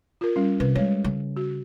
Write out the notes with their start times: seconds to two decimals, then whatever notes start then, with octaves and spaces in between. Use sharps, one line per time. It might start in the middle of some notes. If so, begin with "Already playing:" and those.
0.21 F4 A#4
0.36 G3 C#4
0.60 C3 B4
0.75 G3 G#3 C#5
1.04 C#3
1.36 F#4